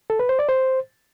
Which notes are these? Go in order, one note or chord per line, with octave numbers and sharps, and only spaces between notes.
A4
B4
C5
D5
C5